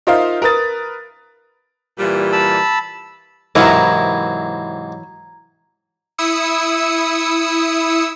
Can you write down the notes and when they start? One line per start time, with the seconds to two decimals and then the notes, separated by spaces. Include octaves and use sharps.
0.07 D#4 F4 A#4 C5 E5 F5
0.42 A#4 B4 D#6 A6
1.99 A#2 E3 G3
2.33 A5 B5 E6
3.55 G#2 C3 E3 F#3 E4 A#4 A#5 G#6
6.18 E4 D#6 E6 C#7